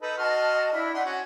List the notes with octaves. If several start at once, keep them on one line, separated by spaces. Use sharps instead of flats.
D#4 A4 B4
F#4 D#5 A5 C6 F6
D4 E4 E5
D4 D#4 F#5 C6
C#4 F#4